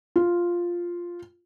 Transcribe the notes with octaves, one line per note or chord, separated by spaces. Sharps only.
F4